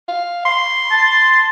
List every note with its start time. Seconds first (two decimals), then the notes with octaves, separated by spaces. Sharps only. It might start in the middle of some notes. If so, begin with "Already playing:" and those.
0.08 F5
0.45 C6
0.91 A5